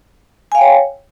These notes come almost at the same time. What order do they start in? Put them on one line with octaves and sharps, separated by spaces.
G#5 F5 G5 C#5